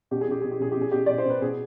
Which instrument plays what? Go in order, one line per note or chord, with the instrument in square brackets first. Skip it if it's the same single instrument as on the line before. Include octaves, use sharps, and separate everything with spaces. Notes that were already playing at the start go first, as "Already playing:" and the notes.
[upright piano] B2 G4
G#4
B2 G4
B2 G#4
G4
B2 G#4
B2 G4
G#4
B2 G4
B2 D5
C5
B2 B4
B2 G#4